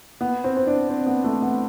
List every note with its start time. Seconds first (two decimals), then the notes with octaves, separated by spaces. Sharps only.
0.21 B3
0.44 C4
0.57 C4
0.67 D4
0.90 C4
1.07 B3
1.24 A3
1.42 B3